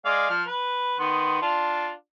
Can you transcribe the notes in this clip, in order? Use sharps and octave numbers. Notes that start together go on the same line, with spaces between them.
G#3 D5 F5
F3 F6
B4
D#3 B3 C6
D4 F4